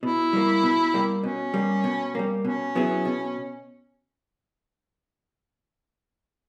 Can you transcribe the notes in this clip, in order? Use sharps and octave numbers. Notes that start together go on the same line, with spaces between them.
B2 E4
G3 A#3
B2
G3 A#3
B2 C#4
G3 A#3
B2
G3 A#3
B2 C#4
F#3 B3 E4 G#4
B2